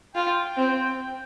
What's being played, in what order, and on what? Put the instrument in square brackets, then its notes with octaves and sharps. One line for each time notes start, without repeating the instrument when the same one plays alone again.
[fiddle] F4 [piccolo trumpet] G5
[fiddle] C4